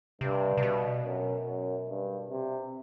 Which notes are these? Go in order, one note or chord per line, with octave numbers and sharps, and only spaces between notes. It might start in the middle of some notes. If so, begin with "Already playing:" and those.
G2 C3
C3
B2
F#2
F#2
G2
C3